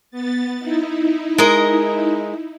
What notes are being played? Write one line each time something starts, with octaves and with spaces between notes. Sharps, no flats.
B3 A6
D#4 E4
G#3 A#4 D#5